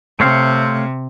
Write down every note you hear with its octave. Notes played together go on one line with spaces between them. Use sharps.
C3 A3 C4 C#5 F5